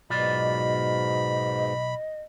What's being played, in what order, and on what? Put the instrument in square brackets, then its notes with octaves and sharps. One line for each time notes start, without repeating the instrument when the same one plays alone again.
[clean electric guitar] B1 F4 D5 [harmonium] G#2 B2 [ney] D#5 [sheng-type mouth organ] B5